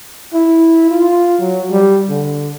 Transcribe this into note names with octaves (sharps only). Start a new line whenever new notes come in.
E4
F4
F#3
G3
D3